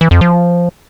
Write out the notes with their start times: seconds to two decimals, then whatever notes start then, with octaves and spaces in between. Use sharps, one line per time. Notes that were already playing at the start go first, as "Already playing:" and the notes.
0.01 E3
0.11 F2
0.21 F3